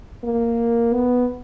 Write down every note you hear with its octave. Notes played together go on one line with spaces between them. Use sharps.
A#3
B3